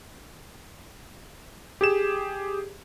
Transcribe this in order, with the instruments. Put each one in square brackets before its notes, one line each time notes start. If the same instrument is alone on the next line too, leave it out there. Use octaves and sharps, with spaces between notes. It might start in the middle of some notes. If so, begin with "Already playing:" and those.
[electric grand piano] G4 G#4 E7